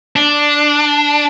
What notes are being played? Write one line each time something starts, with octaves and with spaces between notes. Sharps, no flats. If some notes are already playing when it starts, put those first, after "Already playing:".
D4